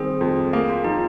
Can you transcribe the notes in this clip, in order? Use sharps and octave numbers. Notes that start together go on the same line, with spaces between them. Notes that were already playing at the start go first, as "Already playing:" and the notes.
Already playing: D#3 G3 C4 G#4
F2
A#3 G#4
F4
F3 D#4